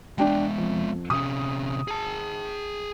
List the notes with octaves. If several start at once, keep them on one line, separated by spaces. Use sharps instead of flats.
G#3 B3 D4 G5
F2
C3 C#4 D#6
G#4 A5